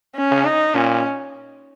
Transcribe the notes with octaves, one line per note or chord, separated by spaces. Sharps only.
C#4
C#3
D#4
A#2 C#4